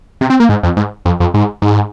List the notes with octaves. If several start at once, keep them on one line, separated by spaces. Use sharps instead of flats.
C3
C4
A#3
G#2
F2
G#2
F2
F2
G#2
G#2